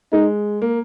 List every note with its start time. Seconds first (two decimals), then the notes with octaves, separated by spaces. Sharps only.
0.12 G#3 D#4
0.62 A#3